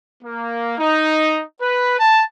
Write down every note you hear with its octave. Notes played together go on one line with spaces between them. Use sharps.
A#3
D#4
B4
A5